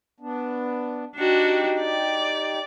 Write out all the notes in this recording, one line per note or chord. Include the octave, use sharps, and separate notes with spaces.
B3 D4
D4 D#4 F#4 G4
D5